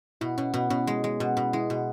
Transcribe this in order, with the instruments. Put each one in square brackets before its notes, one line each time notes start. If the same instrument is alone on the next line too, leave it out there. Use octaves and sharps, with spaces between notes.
[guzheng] B2 [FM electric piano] E4
[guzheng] B2 [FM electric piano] C#4
[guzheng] B2 [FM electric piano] B3
[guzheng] B2 [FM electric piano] C#4
[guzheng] G#3
G#3
B2
B2
[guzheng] G#3 [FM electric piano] E4
[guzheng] B2 [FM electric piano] F#4